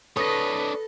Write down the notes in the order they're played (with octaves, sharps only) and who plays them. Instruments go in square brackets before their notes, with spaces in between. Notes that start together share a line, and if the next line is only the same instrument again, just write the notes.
[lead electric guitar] D4 C#5 [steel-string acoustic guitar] A4 [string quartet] B4 [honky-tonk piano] D#6 A#6